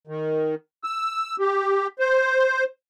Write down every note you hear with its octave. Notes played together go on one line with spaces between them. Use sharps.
D#3
E6
G4
C5